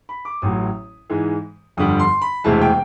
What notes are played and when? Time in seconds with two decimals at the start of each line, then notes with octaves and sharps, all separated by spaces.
0.09 B5
0.25 D6
0.42 A1 A2 F#3 D#6
1.10 G#2 E3 G#3
1.77 G1 F2 D3 G3 D#6
1.99 C6
2.22 B5
2.44 E1 D2 C3 E3 G#3 A5
2.61 G5